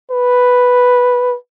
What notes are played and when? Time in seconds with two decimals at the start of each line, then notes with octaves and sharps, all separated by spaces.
0.11 B4